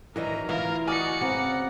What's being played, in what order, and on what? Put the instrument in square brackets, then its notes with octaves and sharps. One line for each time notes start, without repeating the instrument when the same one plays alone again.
[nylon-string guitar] D#3 F#3 D4 [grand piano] E3 D#4 [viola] A#4 A#5
[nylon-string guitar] D2 E3 [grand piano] F4 [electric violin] A#4 [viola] F5
[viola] F#4 D#5 [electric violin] D5 C#7 [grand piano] G#5 D#6 F6
[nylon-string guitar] C#3 B3 C4 [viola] F#5 A#5